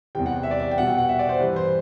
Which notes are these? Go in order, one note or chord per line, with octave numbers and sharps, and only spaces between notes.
E2 C3 E3 G3 G5
F#5
F#5
E5
D5
E5
G5
B2 G3 F#5
G5
F#5
E5
D5
C5
G2 E3 G3 B4
C5